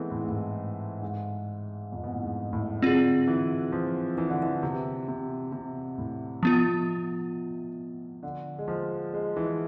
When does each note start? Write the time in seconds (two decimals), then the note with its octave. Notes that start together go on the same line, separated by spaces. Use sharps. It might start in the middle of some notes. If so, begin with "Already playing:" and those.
Already playing: E3 G#3 A3 B3 C4
0.11 A2
0.19 G#2
0.29 A2
1.02 G#2
1.92 F2
2.04 B2
2.14 A2
2.22 G#2
2.53 A2
2.82 D3 C4 F4 G#4
3.27 E3
3.72 F3
4.18 E3
4.30 D3
4.42 E3
4.63 C3
5.08 C3
5.52 C3
5.98 A2
6.42 B2 F3 B3 F4
8.23 D3
8.59 G#3
8.68 F3
9.14 G#3
9.37 E3